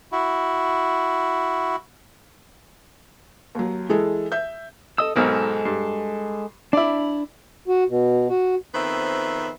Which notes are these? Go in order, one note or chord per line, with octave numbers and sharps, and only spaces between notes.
E4 F#4
D#2 F#3
E3 G#3 G#4 A4
E5 G6
A4 D#5 D#6 E6
B1 G#2 G#3 A4 A#4 F6
G2
D4 E4 D5 B5
F#4
B2
F#4
F2 D#3 B3 C4 C5 E5